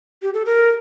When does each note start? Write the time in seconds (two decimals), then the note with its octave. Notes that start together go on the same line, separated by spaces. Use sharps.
0.22 G4
0.34 A4
0.45 A#4